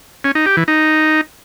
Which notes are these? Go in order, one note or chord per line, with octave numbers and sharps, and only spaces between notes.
C#4
D#4
G4
E3
D#4